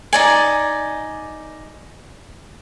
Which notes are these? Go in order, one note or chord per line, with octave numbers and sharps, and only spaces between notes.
D#4 D5 G#5